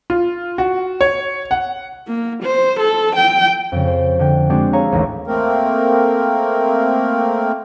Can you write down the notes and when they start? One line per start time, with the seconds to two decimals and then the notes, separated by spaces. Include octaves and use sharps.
0.10 F4
0.58 F#4
1.01 C#5
1.51 F#5
2.08 A#3
2.43 C5
2.80 A4
3.16 G5
3.72 F2 C#3
3.87 C5
4.19 D3 G5
4.50 G#3 C4 D4 F#4 G4
4.73 G#4 C#5 F5 A#5 E6
4.92 A1 D#2 E4 A#6
5.27 A3 A#3 C4 A#4